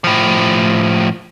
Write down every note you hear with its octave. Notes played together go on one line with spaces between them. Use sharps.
A2 F3